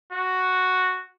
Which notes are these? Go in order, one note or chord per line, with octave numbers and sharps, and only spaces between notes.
F#4